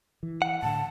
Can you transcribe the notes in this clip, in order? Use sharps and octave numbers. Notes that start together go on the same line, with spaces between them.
E3
F#5
A2 D3 A5